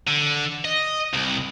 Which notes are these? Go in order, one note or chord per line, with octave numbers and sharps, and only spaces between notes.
D3
D#5
C2